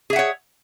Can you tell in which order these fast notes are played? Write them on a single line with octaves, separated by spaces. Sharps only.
G#4 E5 F#5 C#5